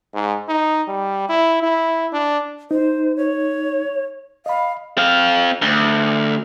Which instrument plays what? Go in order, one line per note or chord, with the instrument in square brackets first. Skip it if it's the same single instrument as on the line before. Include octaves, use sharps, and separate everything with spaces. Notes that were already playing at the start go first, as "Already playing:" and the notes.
[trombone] G#2
D#4
G3
E4
E4
D4
[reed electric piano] D#4 [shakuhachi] C5
[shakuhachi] C#5
[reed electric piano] D#5 B5 [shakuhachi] F5
[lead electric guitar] C4 F5
D2